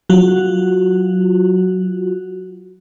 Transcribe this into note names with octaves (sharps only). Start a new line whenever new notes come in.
F#3 F4 F#4